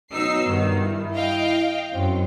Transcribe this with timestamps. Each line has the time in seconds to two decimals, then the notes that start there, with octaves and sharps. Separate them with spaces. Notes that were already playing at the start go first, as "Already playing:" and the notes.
0.13 B2 F#3 D#4 E6 C7
0.47 G2 D#3
0.80 E4
1.14 D#5 F5 G5
1.92 F#2 F#3 C4